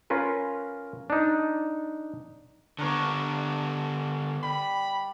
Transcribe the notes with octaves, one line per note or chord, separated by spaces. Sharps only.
C#4 F4 A#4 B4
D4 D#4
D3 B3 D4 A#4 C#5
G3 B5